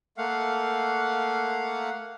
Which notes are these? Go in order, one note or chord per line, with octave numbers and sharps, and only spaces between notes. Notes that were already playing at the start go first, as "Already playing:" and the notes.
A3 A#3 F5 F#5